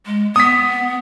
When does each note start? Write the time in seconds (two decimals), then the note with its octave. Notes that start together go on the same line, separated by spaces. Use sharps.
0.06 G#3
0.36 B3 D#6 B6